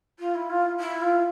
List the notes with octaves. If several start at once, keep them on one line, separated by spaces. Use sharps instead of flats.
F4
E4
F4
E4
F4